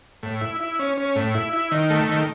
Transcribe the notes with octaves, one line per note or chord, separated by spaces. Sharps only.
A2
E4
E4
C#4
C#4
A2
E4
E4
D#3
A3
D#3